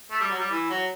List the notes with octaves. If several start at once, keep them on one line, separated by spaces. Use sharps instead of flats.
A3
G3
F#3
G3
E3
F#3